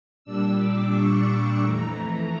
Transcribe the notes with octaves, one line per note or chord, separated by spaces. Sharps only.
A#2 G3 D4 E6
D6
C#6
D6
F2 E3 A3 A#5
A#5